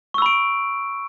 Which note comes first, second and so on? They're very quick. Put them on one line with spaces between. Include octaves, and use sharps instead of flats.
C#6 E6 B5 D7